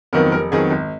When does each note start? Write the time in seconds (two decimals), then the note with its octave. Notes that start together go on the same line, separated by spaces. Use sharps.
0.13 F2 D#3 F#3 B3 A#4
0.32 F1 A#4
0.52 F2 D#3 F#3 B3 G#4
0.71 G#1